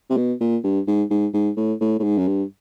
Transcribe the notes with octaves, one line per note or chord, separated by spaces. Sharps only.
C3
B2
A#2
G2
G#2
G#2
G#2
A2
A2
A2
G#2
F#2
G2